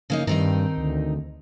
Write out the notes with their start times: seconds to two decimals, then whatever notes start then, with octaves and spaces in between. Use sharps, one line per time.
0.10 C#3 A#3 D#4
0.27 G2 D#3 C4 D#4
0.78 D2